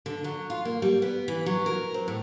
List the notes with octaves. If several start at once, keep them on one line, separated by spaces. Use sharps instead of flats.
D3
F#3
F4
A#3
G3
B3
E3
F#3
A#4
C4
A2